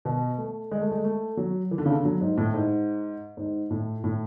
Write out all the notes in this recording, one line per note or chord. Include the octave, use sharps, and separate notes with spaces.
B2
A3
G#3
A3
G#3
A3
F#3
E3
D3
C#3
D3
F#3
G#2
A2
G#2
G#2
A2
A2